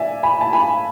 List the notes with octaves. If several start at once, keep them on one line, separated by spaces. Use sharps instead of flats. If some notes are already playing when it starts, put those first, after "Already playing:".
Already playing: D5 E5 G#5
G#5 B5
A5
G#5 B5